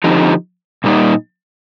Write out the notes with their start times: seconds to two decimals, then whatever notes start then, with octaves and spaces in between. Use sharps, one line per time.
0.04 D3 F3 C4 D#4 G4
0.84 A#2 G3 A#3 D#4